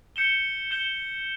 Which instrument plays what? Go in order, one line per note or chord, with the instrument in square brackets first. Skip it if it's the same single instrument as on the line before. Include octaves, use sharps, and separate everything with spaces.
[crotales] G6 C#7 E7 G7
G6 C#7 E7 G7